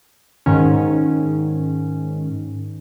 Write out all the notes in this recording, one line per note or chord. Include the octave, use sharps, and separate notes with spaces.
G#2 D#3 C#4